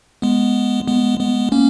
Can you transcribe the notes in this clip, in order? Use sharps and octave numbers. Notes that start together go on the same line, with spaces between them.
G#3 B3
G#3 B3
G#3 B3
A#3 C#4